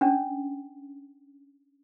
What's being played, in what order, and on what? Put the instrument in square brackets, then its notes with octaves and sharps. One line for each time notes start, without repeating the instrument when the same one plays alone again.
[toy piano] C#4 D4